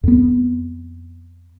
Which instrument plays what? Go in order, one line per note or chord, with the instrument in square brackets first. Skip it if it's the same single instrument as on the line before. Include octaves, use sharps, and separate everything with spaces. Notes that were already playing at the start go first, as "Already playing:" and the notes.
[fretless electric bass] F2 B3